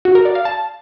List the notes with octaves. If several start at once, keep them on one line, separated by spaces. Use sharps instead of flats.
F#4
A#4
D5
F5
A5